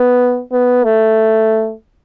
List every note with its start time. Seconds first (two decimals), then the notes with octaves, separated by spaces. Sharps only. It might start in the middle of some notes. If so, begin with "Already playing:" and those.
Already playing: B3
0.52 B3
0.84 A3